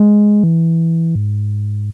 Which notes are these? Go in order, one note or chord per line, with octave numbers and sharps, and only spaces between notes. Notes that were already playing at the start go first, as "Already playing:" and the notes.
Already playing: G#3
E3
G#2